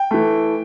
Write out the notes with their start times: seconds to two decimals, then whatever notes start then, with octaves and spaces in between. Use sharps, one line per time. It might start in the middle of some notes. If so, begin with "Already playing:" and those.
Already playing: G5
0.11 E3 A3